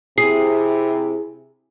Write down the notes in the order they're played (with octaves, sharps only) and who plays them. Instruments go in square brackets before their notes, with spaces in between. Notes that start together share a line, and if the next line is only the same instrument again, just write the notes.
[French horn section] C3 E4 [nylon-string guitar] G#4 [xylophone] C7